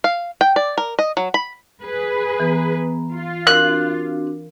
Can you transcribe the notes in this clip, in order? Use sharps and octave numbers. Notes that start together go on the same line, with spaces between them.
F5
G5
D5
A#4
D#5
F#3
B5
G#4 B4
E3 B3 A#5
F4
C4 D4 F#4 A#4 F5 F#6